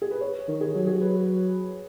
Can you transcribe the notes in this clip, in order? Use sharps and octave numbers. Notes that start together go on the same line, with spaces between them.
G#4
B4
C#5
D#3
G#4
F#3
G#4
B4